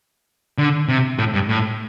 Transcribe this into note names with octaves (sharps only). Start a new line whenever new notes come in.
D3
C3
A2
G2
A2